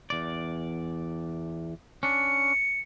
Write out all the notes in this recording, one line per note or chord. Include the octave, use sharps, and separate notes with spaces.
E2 D5
C#4 D4 C#7